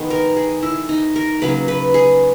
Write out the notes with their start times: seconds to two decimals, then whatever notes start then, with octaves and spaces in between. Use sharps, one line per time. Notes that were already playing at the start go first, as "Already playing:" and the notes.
Already playing: D#3 G#3 B3
0.10 A#4
0.37 G#4
0.63 E4
0.89 D#4
1.16 A#4
1.42 C#3 F#3 A#3 B4
1.68 B4
1.94 G#4